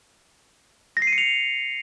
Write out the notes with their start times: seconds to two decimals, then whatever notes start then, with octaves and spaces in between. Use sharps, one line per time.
0.97 A#6
1.02 C7
1.07 D#7
1.13 C#7
1.18 F7